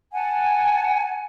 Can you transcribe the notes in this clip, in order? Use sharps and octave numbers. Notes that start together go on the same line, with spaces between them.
F#5 G#5 A5